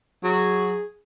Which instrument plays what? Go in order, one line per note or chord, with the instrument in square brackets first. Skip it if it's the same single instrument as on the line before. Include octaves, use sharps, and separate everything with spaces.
[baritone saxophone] F#3 [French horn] G#4